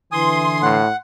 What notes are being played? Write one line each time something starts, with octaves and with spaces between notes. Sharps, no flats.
D3 E3 G#5 C6 D#6
A2 F#5